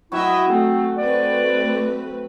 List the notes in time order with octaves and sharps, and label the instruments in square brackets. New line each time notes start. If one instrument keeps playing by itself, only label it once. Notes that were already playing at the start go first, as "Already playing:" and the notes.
[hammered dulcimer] F#3 F#4 G5 [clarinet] E4 [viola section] D#5 E5
[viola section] A3 [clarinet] C4
[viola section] A3 C4 B4 [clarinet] D5